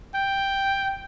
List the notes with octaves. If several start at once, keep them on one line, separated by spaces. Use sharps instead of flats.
G5